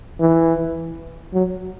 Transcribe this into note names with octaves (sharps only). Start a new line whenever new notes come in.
E3
F#3